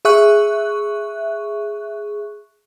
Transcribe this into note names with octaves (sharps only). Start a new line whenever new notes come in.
G#4 E5 C#6 F#6